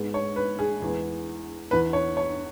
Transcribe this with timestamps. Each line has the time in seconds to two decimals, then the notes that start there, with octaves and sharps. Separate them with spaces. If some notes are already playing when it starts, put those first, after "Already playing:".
Already playing: G#2 G#3 B3
0.14 C#5
0.36 B4
0.59 G#4
0.82 E2 E3 G#3 B3
1.71 E2 E3 B3 B4
1.93 C#5
2.17 C#5